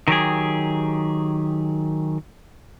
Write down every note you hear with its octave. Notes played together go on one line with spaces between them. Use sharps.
D#3 F#3 G4 G#4